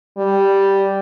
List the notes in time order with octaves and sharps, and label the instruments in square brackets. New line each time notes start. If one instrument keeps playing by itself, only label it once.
[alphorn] G3